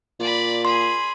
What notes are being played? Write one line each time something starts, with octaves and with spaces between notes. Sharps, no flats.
A#2 D5 B5
G#4 B5 C6